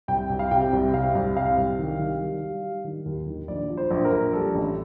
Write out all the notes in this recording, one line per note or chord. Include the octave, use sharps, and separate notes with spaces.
C2 G5
C2
F5
C3 G5
C2
C3 F5
C2
C3 F5
C2
D#3
D#3
G3
G3
G3
D#3
D#2
D#3
A#1 D5
F3
C5
A#1
A#4
A#1
G3 A4
A1